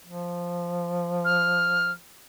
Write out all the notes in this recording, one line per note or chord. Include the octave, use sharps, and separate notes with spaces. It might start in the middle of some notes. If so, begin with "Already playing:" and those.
F3
F6